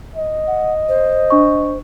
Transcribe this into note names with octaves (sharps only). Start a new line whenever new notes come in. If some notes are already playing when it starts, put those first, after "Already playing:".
D#5
F#5
C5
D4 C#6